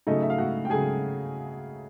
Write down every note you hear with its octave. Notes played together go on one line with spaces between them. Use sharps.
C#3 F#3 A3 D#4 D#5
E5
F5
F#4 F#5
G5
C#3 F#3 A3 G#4 G#5